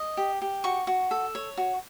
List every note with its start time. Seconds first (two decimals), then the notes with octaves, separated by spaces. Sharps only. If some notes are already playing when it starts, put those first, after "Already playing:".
Already playing: D#5
0.17 G4
0.42 G4
0.64 F#4 C#6
0.87 F#4
1.11 A4
1.35 C#5
1.57 F#4